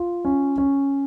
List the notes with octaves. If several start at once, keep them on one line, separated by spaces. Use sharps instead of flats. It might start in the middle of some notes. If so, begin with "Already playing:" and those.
Already playing: F4
C#4
C#4